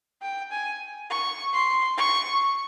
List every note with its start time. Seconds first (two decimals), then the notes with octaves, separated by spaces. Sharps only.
0.22 G5
0.51 G#5
1.10 C#6
1.54 C6
1.98 C#6